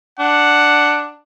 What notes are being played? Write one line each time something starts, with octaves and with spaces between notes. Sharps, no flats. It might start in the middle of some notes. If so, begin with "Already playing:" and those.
D4 F#5